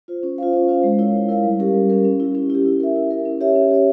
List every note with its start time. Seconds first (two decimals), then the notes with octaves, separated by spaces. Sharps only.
0.08 F4 C5
0.23 C#4
0.38 F4 C5 F5
0.53 C#4
0.68 F4 C5 F5
0.83 G#3
0.99 E4 A#4 C#5 F5
1.14 G#3
1.29 E4 A#4 C#5 F5
1.44 G3
1.59 C#4 G4 A#4
1.74 G3
1.90 C#4 G4 A#4
2.05 C#4
2.20 E4 G4
2.35 C#4
2.50 E4 G4
2.65 E4
2.80 A#4 E5
2.95 E4
3.10 A#4 E5
3.26 C#4
3.41 G4 C#5 E5
3.56 C#4
3.71 G4 C#5 E5